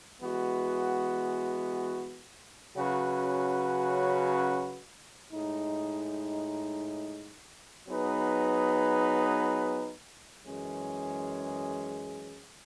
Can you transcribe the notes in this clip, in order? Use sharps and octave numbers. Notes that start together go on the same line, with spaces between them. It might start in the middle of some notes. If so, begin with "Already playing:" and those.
E3 G#3 B3 F#4
C#3 F#3 C#4 F#4 B4
A2 G#3 D#4
F#3 B3 D#4 G#4 B4
F#2 E3 G#3 C#4 G#4